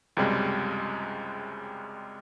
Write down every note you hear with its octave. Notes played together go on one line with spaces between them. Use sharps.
C#2 F#2 C3 G3 G#3